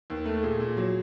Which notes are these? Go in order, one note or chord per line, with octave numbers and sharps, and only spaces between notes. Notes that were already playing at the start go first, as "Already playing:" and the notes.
D#2
A3
A#2 G#4
A#2
F#3